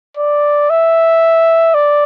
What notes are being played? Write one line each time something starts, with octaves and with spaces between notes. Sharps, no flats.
D5
E5
D5